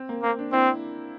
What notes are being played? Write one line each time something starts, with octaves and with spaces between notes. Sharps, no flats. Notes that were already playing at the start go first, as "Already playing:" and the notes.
Already playing: C4
A#3
A#3 C4
D4
C4 E4